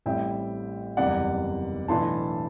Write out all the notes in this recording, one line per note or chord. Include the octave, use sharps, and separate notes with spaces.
A1 A2 G3 C4 E5 G5
F#1 E2 C3 G3 D5 F#5
B1 A2 E3 B3 D4 A5 C6